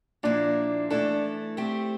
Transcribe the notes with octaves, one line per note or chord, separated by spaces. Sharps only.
A#2 F3 A#3 D4 E4
E3 A3 D4 E4 A4
A3 C4 G4